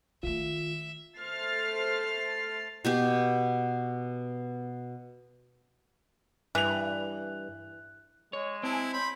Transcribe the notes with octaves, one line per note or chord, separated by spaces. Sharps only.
D#3 A3 F4 E5
A3 A4 C5 F6 A6 C7
B2 B3 G4
G2 E3 F#6 F7
G#3 C#5
C4 E4 G#5 A5
C#5 B5 C6 G6